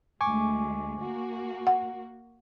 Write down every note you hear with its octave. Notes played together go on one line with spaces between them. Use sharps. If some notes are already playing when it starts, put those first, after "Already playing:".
D2 G#3 G#5 C#6 D6
A#3 F#4
F#5